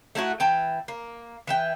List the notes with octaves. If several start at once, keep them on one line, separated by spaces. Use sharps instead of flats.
A3 D#4 E4 F#4
E3 G5 A5
A#3
E3 E5 G5